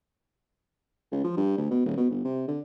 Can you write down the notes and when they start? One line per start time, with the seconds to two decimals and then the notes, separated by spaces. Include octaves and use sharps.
1.12 C#2
1.24 F3
1.37 G2
1.58 D2
1.71 B2
1.85 D#1
1.97 B2
2.10 G1
2.25 C3
2.48 D3